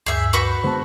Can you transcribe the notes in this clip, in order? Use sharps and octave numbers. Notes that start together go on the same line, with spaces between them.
D2 G2 G#4 E5 G6
F#4 B4 C#6
D3 G#3 B3 C5 A5